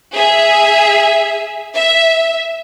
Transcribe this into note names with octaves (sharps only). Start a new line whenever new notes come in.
G#4 E5
E5